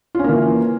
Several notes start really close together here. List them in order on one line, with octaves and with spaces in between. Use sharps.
F4 C#4 A#3 E3